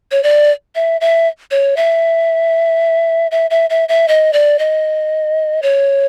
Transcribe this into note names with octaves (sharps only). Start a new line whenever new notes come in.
C#5
D5
E5
E5
C#5
E5
E5
E5
E5
E5
D#5
D5
D#5
C#5